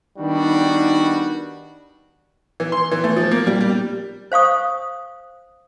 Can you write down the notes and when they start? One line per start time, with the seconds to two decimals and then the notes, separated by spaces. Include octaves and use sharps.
0.18 D#3 G3 B3 D4 D#4 F#4
2.60 E3
2.72 C6
2.91 E3
3.04 A3
3.16 F3
3.31 A#3
3.47 G3
3.61 G3
4.32 C5 F5 C#6 D#6